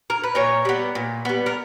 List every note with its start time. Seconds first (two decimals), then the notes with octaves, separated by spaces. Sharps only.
0.10 A#4
0.24 B4
0.35 A#2 A#4 C#5
0.65 G3 B3
0.95 A#2
1.25 G3 B3
1.46 A#4